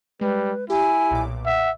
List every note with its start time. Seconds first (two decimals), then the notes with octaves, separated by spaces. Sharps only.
0.21 G3 G#3 B4
0.70 E4 G4 G#5
1.11 B1 A#2 D6
1.46 E5 F#5